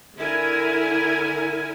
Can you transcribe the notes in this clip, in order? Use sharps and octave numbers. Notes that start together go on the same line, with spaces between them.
D3 E4 A#4 G#5